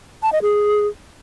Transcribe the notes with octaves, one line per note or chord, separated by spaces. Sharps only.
A5
D#5
G#4